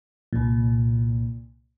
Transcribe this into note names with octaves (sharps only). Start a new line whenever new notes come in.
C2 A#2